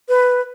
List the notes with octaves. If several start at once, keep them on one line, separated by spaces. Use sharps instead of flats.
B4